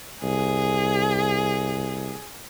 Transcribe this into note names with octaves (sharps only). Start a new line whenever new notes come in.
C2 G#4